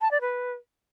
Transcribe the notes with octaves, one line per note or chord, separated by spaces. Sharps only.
A5
D5
B4